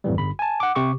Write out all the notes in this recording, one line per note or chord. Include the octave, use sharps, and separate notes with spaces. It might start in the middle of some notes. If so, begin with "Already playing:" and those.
F2 A2 E3 G3
G1 B5
G#5 A5
F#5 D6
C3 G4 C#6 D6